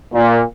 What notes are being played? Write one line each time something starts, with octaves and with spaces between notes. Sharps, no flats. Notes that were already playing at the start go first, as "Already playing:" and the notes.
A#2